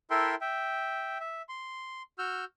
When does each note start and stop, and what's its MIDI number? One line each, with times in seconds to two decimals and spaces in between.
0.10 0.35 64
0.10 0.35 69
0.10 0.35 70
0.10 0.35 76
0.10 0.35 79
0.10 0.35 84
0.41 1.18 76
0.41 1.18 79
1.20 1.42 76
1.49 2.02 84
2.18 2.45 66
2.18 2.45 88
2.18 2.45 89
2.18 2.45 91